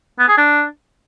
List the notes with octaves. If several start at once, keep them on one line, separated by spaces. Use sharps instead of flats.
B3
G#4
D4